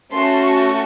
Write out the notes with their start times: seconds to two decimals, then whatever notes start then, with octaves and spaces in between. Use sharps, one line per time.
0.13 A3 C#4 F#4 A4 C6
0.46 C#6